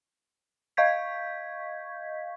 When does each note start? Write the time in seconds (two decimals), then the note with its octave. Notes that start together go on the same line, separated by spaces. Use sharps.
0.77 D#5 F5 C#6 G6 G#6 B6